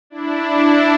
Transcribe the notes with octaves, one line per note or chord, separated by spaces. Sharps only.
D4 E4